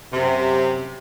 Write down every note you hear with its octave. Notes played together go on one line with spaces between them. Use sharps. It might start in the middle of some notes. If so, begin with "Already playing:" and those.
F#2 C3